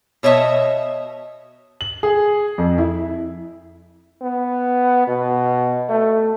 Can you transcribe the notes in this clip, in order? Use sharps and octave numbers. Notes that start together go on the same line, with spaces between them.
B2 C#5 D#5 E5 A5
F#7
G#4
F2
E4
B3
B2
A3